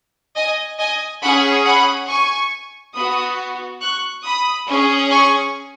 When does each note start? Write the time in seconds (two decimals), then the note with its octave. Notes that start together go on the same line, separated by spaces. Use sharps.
0.36 D#5 G#5
0.79 D#5 G#5
1.22 C#4 G#4 F#5 B5
1.65 F#5 B5
2.08 G#5 C#6
2.95 B3 F#4 B5 D#6
3.81 C#6 F#6
4.24 B5 D#6
4.68 C#4 G#4
5.11 G#5 C#6